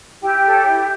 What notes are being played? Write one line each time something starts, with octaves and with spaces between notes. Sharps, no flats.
E4 G4 G5
A4 C#5
E4